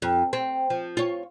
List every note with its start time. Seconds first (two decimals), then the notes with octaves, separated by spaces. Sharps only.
0.02 F2
0.33 C4
0.70 F3
0.97 F4 C#5